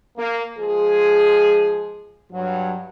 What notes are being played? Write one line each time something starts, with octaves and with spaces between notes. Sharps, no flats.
A#3
F3 G#3 G#4
G2 F#3